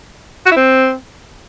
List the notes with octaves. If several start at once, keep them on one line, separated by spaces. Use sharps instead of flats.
F#4
E4
C4